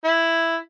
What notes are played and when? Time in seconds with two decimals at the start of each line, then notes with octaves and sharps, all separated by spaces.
0.05 E4